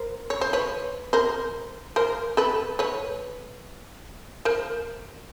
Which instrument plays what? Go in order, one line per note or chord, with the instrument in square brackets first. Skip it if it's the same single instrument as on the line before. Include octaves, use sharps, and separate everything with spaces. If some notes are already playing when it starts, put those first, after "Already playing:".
Already playing: [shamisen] A#4 C5
C#5
C5
B4 C#5
A#4 C5
A#4 C5
A4 B4
B4 C#5
A#4 C5